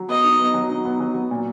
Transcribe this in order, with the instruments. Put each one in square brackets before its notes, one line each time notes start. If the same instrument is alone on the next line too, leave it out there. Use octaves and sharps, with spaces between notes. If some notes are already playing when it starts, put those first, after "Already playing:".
Already playing: [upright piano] F#3
[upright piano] B3 [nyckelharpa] D#5
[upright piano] D#4
B3
F#3
D#4
B3
F#3
F#3
A#2